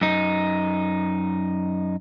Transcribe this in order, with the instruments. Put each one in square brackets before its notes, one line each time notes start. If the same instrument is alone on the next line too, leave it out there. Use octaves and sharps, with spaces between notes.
[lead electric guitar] F#2 D#4